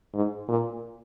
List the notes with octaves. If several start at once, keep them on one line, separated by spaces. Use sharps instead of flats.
G#2
A#2